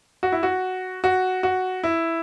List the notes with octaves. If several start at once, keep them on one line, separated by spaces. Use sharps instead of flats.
F#4
E4
F#4
F#4
F#4
E4